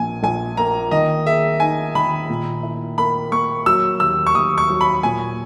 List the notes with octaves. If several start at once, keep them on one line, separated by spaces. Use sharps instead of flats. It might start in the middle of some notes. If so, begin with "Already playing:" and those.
Already playing: A#1 A#2 G#5
A#1 G#5
A#3 A#5
D#3 D#5
G#4 E5
D#4 G#5
D#3 B5
A#2
E4
A#3 B5
A#3 C#6
F#3 E6
D#2 E6
C#6
D#2 D#6
C#6
F#3
B5
A#2 G#5